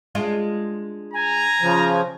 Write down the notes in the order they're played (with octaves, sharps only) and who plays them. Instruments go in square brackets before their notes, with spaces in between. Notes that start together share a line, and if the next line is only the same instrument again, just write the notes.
[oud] G#3 D4 F4
[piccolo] G#5 [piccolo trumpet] A#5
[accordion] C#3 F3